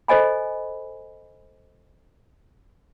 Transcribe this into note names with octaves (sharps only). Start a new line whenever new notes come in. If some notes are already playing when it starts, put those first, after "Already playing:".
A4 C5 D#5 G#5 B5